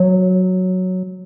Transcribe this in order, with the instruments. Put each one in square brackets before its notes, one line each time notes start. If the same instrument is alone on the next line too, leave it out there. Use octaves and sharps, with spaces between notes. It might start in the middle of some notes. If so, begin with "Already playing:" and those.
Already playing: [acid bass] F#3